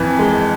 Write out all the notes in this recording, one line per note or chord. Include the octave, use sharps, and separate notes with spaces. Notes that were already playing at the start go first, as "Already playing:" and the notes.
Already playing: F2 E3
G#3